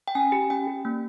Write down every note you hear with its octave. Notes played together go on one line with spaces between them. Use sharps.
G5
C#4 G#5
G4
C#4 G5
G4
A#3